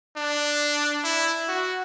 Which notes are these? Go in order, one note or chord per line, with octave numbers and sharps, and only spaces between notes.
D4
E4
F#4